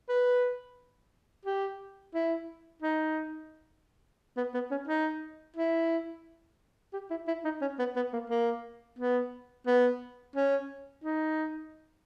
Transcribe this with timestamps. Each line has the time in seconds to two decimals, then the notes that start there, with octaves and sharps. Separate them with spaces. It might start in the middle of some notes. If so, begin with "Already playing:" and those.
0.09 B4
1.45 G4
2.14 E4
2.82 D#4
4.37 B3
4.54 B3
4.71 C#4
4.87 D#4
5.56 E4
6.93 G4
7.10 E4
7.27 E4
7.45 D#4
7.61 C#4
7.79 B3
7.96 B3
8.13 A#3
8.30 A#3
8.99 B3
9.67 B3
10.36 C#4
11.04 D#4